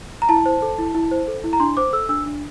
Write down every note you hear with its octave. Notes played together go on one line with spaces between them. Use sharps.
A#5
E4 A5
C5
A4
E4
E4
C5
A4
E4
A#5
D4 C6
C5 D6
A4 E6
D4 E6
D4